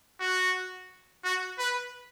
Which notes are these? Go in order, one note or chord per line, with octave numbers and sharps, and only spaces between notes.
F#4
F#4
B4